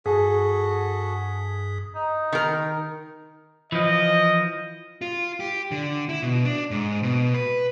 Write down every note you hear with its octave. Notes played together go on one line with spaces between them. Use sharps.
G2 F#4 G#4 A4 D#6 B6
D#4
D#3 A#4
E3 F3 D#5
F4
G4
D3
E4
B2
D4
G#2
B2
B4